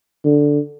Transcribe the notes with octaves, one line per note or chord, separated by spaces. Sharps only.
D3